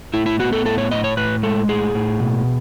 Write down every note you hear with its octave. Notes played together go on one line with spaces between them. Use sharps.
A2 E4
E4
B3 F#4
A4
A2 A4
C#5
A2 D#5
C#5
A2 B4
G#3 A4
A2 G#4
A2
B2